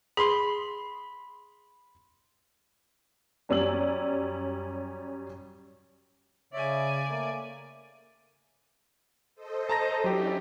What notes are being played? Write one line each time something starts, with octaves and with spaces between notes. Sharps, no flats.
G#4 B5 C6
F#2 G3 C#4 D5 E6 F#7
C#3 C#5 D5 E5 G#5
A3 A#3
A4 C5 D#5
A5 A#5 A#6
F#3 C#4 D4 E4 G4